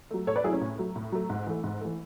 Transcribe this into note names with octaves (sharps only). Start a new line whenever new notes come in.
F#3 A3
A2 A4 C#5
B4 D5
F#3 A3 E4 G#4
C#4
A2
F#3 A3
A2
F#3 A3
G#2
E3 A3
G#2
E3 A3